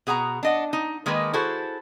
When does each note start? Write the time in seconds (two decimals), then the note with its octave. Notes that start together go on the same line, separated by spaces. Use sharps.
0.07 B2 G#4 F#5 A5 A#5
0.43 D4 D#5 F#5
0.73 D#4
1.06 D#3 G#3 A#3 D#4 B4
1.33 E4 F#4 G#4 A4 C5